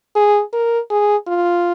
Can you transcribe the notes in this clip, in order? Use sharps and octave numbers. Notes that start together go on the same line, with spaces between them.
G#4
A#4
G#4
F4